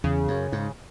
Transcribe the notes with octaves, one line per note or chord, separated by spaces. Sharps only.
E2 C#3
F#2
G#2